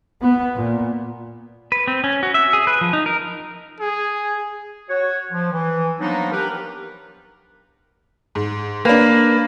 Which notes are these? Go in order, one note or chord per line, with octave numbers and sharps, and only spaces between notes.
B3
A#2
B4
C4
C#4
F#4
E5
G#4
B4
F3
D#4
A#4
G#4
F#4 C#5
F3
E3
F3 F#3 A#3 B3 D4 D#4
G4 A#4 B4
G#2
A#3 D4 B4